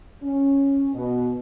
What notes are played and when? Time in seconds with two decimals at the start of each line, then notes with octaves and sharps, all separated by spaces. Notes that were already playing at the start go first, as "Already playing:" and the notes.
0.23 C#4
0.94 B2